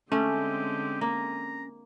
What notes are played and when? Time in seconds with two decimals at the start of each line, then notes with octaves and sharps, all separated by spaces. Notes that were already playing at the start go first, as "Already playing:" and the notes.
0.12 D3 G#3 A3 C4 C#4 G4
1.01 A#3 A#5